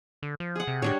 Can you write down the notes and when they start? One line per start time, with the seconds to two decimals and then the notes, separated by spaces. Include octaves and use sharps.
0.23 D3
0.40 F3
0.56 G#4 F#5
0.67 C3
0.82 A2 G3 D4 C#5